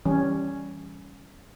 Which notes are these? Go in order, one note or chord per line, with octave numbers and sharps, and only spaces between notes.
E3 G3 C#4